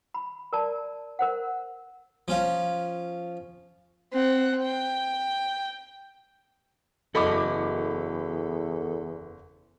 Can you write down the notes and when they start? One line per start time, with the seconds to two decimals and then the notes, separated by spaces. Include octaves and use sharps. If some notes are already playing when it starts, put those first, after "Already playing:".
0.14 B5
0.53 A#4 D5 A5
1.19 A#4 C5 F#5
2.28 F3 C#4 F4
4.13 C4 F#5
4.62 G5
7.15 F#1 E2 F#4 A4 D#5 B5 D6